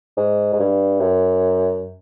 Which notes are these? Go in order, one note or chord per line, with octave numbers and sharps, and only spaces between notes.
G#2
G#2
G2
F#2